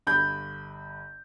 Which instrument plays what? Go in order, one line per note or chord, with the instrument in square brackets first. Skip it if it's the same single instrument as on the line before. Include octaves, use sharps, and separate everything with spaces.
[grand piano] G1 B5 G6